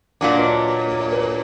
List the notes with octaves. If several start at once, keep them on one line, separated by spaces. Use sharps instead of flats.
A#2 F#3 D4 D5 F5
B4 D#5
B4
A#4